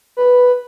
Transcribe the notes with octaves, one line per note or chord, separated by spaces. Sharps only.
B4